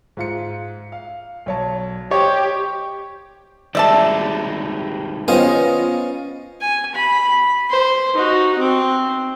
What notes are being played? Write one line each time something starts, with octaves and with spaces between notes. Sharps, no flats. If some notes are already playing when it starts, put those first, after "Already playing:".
G#2 F4 C#7
F5
B1 C#5 A5
G4 C5 C#5 D#5
D#3 G3 G#3 D5 E5 A5
B3 C#4 F4 C5 D#5
G#5
B5
C5
D#4 F#4
C4